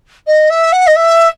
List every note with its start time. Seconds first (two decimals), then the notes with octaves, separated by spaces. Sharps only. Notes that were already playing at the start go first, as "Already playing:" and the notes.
0.27 D#5
0.50 E5
0.72 F#5
0.87 D#5
0.96 E5